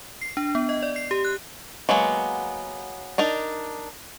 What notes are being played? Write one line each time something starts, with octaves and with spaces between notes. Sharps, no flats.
C7
D4
B3
D#5
D5
C7
G4
F#6
F#3 G#3 A#3 B3
D4 D#4 A#4